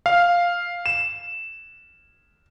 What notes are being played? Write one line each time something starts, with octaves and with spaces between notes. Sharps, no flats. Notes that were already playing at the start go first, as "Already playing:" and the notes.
F5
E7